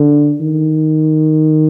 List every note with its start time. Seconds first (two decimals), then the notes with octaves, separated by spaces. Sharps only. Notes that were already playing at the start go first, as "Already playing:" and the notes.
Already playing: D3
0.41 D#3